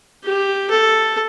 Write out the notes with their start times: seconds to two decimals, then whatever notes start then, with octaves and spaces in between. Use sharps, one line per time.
0.24 G4
0.70 A4